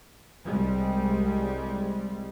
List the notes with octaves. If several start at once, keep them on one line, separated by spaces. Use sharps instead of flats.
C2 G3 G#3